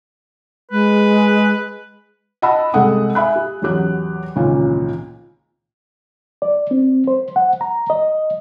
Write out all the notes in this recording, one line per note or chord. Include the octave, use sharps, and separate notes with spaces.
G#3 B4
D#5 F#5 A5 B5 E6
C2 G#3 G#4 A4 F#5 D#6
E5 G#5 B5 F#6
G4
A1 E2 F#3 G4 F#6
G#1 C#2 A#2 E3 C#4 F4
D5
C4
C5
F#5
A#5
D#5